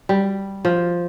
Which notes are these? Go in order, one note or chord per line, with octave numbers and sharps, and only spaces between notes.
G3
F3